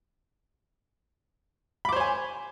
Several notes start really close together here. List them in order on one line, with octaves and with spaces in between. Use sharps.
B5 D6 C5 C#5 G#5